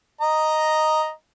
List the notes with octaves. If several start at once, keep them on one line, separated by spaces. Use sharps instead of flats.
D#5 A#5